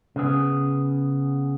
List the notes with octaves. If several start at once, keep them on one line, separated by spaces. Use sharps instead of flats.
C#3 B3 G#4